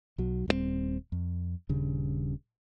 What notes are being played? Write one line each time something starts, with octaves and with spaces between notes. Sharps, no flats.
B1 F#3
D#1 G2 G3 C4
F2
D#1 G2 C#3